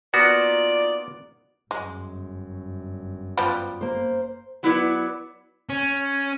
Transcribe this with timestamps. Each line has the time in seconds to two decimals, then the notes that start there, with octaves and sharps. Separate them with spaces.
0.14 A#3 B3 D#4 F4 F#4 D5
1.71 G1 F#2 G#3
3.37 F3 G3 B3 B5
3.81 A#3 C5
4.63 F#3 B3 E4 B4 D5
5.69 C#4